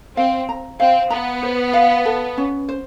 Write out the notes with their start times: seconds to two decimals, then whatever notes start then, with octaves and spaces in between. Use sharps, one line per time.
0.17 C4 F5
0.49 A#5
0.80 C4 F5
1.10 B3 A#5
1.43 C5
1.73 F5
2.05 A4
2.38 C#4
2.69 C5